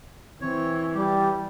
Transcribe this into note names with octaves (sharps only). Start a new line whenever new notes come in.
E3 C4 C#5
G3 G4